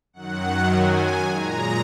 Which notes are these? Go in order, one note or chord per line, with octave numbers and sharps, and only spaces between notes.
F#2 D#3 F#3 F#5
G#5
A#2 G#3 A#5